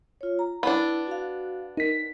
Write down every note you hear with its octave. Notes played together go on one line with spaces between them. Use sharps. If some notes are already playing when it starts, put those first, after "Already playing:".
F4 C#5
A#5
B3 D4 E4
F#4 F5
D#4 A#4 B6